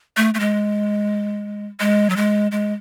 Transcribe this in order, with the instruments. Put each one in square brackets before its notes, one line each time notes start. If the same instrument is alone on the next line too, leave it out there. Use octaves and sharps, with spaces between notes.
[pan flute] A3
A3
G#3
G#3
F#3
G#3
G#3